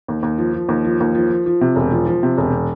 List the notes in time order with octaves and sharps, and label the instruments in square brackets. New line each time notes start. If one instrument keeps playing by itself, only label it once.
[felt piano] D#2
D#2
F3
F3
D#2
F3
D#2
F3
F3
F3
C3
E1
F3
F3
C3
E1